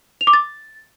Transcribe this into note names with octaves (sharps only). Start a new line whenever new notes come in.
F7
D6
A6